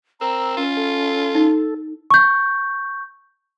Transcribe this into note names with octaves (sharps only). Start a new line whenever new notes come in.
C4 A#4 A#5 E6
C#4 F4
A4
D#4
C#6 G6